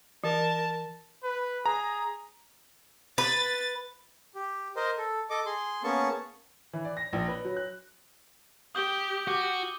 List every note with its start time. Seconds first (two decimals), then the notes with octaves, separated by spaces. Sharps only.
0.24 E3 A#4 A5
1.24 B4
1.66 G#4 A#5
3.18 B4 A6
4.35 G4
4.76 A#4 C5 D#5
4.98 A4
5.30 A4 D#5 D6
5.46 G#4 C6
5.84 A#3 B3 C#4 G#4 A5 C#6
6.73 E3
6.85 D5
6.97 A#6
7.13 A#1
7.28 B4
7.45 F#3
7.56 F#6
8.75 G4 D#6 G6 G7
9.27 F#4 D6 D#7